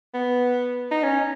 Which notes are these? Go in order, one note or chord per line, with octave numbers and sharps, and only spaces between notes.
B3
D#4
C#4